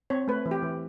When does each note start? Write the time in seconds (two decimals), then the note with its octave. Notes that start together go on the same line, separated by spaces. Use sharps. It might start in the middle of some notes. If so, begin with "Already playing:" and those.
0.10 C4 C#5
0.28 A3 B4
0.46 E3
0.51 G4
0.62 E3